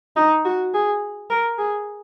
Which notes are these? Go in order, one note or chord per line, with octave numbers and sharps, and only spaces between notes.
D#4
F#4
G#4
A#4
G#4